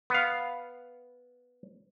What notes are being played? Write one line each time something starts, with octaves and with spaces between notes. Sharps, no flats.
B3 F5